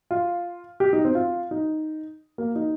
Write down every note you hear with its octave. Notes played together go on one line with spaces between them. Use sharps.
F4
G4
D#4
C4
F4
D#4
A#3
D#4